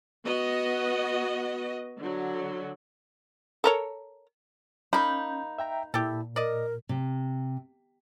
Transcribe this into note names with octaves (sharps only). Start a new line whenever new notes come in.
B3 F#4 D#5
D3 F#3
A4 A#4 C#5
A#3 C#4 D#4 B5 G6
E5 G5 A#5
A#2 E4 G4 A4
A#4 D5 D#5
C3